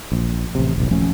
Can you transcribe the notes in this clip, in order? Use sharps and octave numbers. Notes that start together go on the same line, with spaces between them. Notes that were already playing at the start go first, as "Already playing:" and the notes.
A#1
A1 C3
F1 B1
D#1 F3 A3 C#4